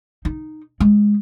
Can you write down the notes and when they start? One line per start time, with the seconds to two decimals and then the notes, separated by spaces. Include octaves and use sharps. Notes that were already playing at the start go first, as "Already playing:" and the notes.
0.25 D#4
0.80 G#3